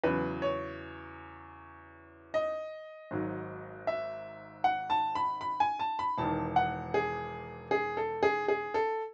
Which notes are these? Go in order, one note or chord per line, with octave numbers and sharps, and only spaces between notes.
E2 C#3 F#3 B4
C#5
D#5
G#1 G#2 F#3
E5
F#5
A5
B5
B5
G#5
A5
B5
E1 E2 D#3 A5
F#5
G#4
G#4
A4
G#4
G#4
A4